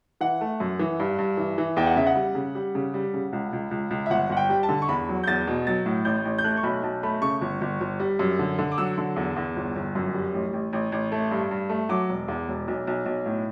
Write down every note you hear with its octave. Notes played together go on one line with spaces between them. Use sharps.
E3 F#5
A3
F#2
E3
G2
G2
E3
E3
E2 G5
F#5
C#3 E5
F#5
G3
C#3
G3
C#3
G3
C#3
C#2
C#2
C#2
C#2
E5
G1 F#5
G1 F#5
G5
G3
A5
D3
C#6
E2 B5
F#3
G6
E2 A6
B2
F#3 A6
A2
A1 G6
A1
G6
A3 F#6
C#6
B1 B5
B1 A5
A3 B5
C#3 C#6
G1
G1
G1
G3
F#2
D3
D3
D6
F#3 E6
D3
E2
E2
G1
G1
F#2
G3
A1
A1
A1
A1
A3
G2
G2
A3
F#3 D6
E1
E2
E1
B1
B1
B1
A2